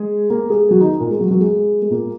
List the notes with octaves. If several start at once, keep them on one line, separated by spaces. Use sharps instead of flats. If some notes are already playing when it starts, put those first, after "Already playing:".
Already playing: G#3 G#4
A#3 A#4
G#3 G#4
F#3 F#4
D#3 D#4
A#2 A#3
G#3
F#3
F#3
G#3
G#3
A#2 A#3